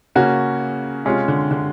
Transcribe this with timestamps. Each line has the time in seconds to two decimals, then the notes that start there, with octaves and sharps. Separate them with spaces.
0.15 C#3 A#3 C#4 F#4
1.05 C3 G#3 C#4 F4
1.28 D3
1.51 D3